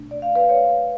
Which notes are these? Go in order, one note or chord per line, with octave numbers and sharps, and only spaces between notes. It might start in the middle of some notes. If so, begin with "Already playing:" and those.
Already playing: B2 A3 D4
D5
F5
B4 D5
C#5 F5